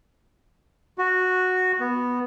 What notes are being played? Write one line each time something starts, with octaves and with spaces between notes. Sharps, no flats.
F#4
B3